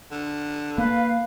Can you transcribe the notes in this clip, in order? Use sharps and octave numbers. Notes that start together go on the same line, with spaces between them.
D3
A#3 B4 F5